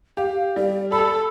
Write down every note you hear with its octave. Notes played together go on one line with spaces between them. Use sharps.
G4 F5
G3 D5
A4 B5 E6